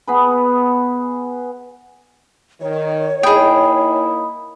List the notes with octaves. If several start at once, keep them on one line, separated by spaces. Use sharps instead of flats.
B3 G#4 B4
D#3 C#5
A#3 D#4 E4 G#4 D#5 G5 B5 D#6